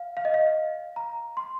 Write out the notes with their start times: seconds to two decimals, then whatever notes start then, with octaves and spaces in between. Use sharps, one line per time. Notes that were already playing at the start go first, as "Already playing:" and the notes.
Already playing: F5
0.17 F5
0.25 D#5
0.34 F5
0.96 A#5
1.37 C6